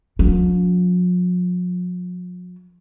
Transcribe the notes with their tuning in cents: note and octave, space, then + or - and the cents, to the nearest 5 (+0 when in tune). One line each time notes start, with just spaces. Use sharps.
F3 +45 D4 -45